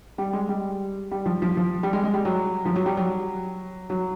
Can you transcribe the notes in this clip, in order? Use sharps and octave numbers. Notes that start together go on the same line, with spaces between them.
G3
G#3
G3
G3
F3
F3
F3
G3
G#3
G#3
G3
F#3
F3
F#3
G3
F#3
F#3